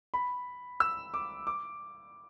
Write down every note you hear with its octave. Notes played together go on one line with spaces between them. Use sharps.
B5
E6
D6
D6